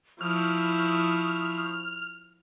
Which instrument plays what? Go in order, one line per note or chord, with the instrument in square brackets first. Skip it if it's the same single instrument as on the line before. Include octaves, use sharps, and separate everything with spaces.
[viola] F3 E4 [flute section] C#6 D#6 [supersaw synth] F6